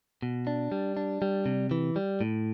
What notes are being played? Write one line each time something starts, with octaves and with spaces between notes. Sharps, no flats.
B2
D4
G3
D4
G3
C3
E3
G3
A2